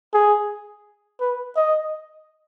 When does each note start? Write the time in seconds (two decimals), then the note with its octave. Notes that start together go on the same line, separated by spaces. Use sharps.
0.14 G#4
1.20 B4
1.56 D#5